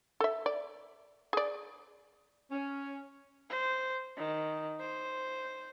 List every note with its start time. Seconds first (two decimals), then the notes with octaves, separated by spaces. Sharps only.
0.20 A4 E5
0.46 D5
1.33 G#4 D5
2.52 C#4
3.50 C5
4.17 D#3
4.80 C5